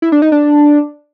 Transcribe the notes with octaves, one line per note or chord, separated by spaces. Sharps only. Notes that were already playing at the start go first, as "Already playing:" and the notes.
E4
D4
D#4
D4